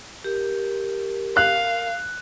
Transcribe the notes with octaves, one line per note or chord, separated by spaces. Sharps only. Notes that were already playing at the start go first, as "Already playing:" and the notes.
G4 A#4
F5 F#6